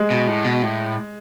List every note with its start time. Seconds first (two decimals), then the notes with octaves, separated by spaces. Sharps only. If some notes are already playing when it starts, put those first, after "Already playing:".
Already playing: G#3
0.10 B2
0.28 A2
0.45 B2
0.63 A2